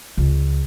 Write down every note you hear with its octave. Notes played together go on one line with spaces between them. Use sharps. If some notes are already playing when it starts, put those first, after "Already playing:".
C#2